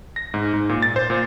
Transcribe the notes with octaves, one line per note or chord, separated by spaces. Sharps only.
A#6
G#2
G#2
A#2
A6
C5
A#2